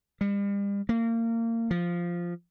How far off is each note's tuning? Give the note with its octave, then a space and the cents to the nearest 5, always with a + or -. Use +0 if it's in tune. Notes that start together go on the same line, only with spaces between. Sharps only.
G3 +40
A#3 -30
F3 -5